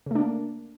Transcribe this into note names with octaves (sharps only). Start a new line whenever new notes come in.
C#3 A3 A#3 D4